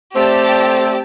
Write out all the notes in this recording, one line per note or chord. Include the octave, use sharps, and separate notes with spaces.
A3 C4 G4 D5 A5